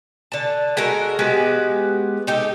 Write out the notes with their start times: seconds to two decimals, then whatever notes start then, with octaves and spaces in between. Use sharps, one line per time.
0.32 D3 A5
0.77 G#3 F#4 A4 A#4
1.19 G#3 B3 F#4 G4
2.27 D#4 G4 A4